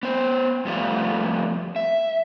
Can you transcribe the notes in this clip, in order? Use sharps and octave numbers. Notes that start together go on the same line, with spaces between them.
B3 C5
F2 G3 A3 B3 F4
E5